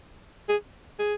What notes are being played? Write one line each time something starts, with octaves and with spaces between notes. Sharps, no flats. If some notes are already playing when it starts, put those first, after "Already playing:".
G#4
G#4